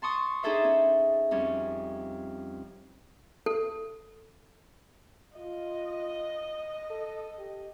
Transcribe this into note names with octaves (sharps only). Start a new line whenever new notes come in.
A5 C6 C#6 D#6
D4 D#4 G#4 A4 C5 E5
C#4
F2 G3 C#4
A4
F4 D#5
A4
G4